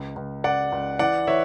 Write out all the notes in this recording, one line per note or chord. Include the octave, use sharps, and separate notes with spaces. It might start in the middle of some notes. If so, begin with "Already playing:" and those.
Already playing: C#2
C#2
C#2 D5 F#5
C#2
E3 D5 F#5
E3 C#5 E5